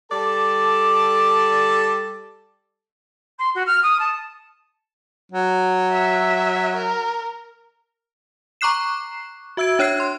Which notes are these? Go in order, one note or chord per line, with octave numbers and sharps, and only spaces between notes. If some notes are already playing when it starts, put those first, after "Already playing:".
G3 A4 D5 A5
C6
F#4
F6
D#6
A5
F#3
E5
A#4
A#5 C#6 D6 F#6 C7 E7
F#4 E5 E6 G#6 D7
D4 C#5 F#6 G#6 C7
C6